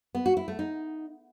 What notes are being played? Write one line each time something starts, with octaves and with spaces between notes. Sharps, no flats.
B3
F#4
E4
A3
D#4